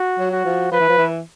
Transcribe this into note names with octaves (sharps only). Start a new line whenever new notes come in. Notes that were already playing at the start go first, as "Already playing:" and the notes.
Already playing: F#4
F#3
F#4
F3
F3 B4
E3
F3
E3